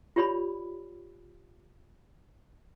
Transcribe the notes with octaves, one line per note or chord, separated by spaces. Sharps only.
F4 G4 C#5 D5 B5